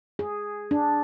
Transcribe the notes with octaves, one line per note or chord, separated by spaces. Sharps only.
G#4
D4